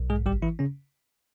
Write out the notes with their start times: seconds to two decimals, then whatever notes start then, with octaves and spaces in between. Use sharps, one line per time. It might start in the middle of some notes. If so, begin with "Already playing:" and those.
Already playing: B1
0.10 G#2 G#3 G#4
0.26 G#1 G3 G4
0.42 E3 E4
0.59 C#3 C#4